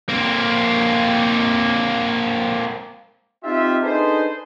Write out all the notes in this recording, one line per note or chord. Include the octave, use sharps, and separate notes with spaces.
A#3 C4
C4 D#4 F4 G4 E5
D4 D#4 G#4 A4 B4 C5